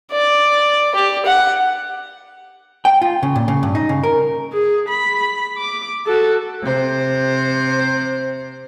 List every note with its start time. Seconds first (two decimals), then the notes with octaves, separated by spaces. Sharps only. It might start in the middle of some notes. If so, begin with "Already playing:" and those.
0.12 D5
0.95 G4
1.25 F#5
2.85 G5
3.02 F4
3.23 C#3
3.36 A#2
3.48 C#3
3.63 G2
3.75 D#4
3.89 C#3
4.03 A#4
4.53 G#4
4.89 B5
5.58 D6
6.06 F#4 A4
6.63 C3 C5